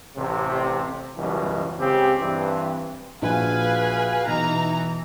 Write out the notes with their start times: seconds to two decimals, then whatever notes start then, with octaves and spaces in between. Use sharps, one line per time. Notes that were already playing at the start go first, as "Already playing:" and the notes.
0.16 A1 C3
1.18 C#2 F#2 B2 E3 G3
1.79 C#2 C#3 C4 G4
2.20 G2 E3 C4
3.22 A#1 F3 F#4 G#4 B4 F5 G#5
4.27 B2 E3 D#4 A#5